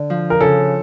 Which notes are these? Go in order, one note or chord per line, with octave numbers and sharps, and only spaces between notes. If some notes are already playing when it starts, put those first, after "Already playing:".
Already playing: D3
F3
A#4
C#3 A4